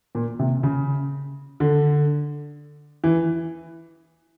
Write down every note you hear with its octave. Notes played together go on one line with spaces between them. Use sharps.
A#2
C3
C#3
D3
E3